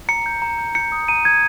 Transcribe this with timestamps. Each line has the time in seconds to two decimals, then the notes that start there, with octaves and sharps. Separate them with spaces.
0.09 A#5 C#7
0.26 G6
0.42 A#5
0.58 G6
0.75 G6 C#7
0.92 D#6
1.08 A#5 D#7
1.25 A#5 G#6